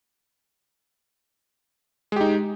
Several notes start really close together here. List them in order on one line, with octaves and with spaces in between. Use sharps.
G#3 G4 D#4